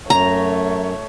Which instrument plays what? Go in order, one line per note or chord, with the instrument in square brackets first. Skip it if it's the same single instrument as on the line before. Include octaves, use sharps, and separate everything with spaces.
[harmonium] F#2 [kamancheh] A3 C#5 [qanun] A#5